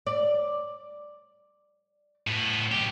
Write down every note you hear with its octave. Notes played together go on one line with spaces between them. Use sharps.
D5
A2 B3
B1 G4